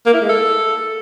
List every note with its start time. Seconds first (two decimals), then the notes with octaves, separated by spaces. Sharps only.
0.06 A#3
0.14 E4
0.21 G#3
0.29 A4